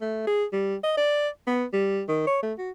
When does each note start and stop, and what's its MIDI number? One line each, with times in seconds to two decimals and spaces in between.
0.01 0.27 57
0.27 0.44 68
0.53 0.75 55
0.83 0.97 75
0.97 1.28 74
1.47 1.64 59
1.73 2.03 55
2.08 2.25 51
2.27 2.38 73
2.42 2.53 57
2.58 2.71 66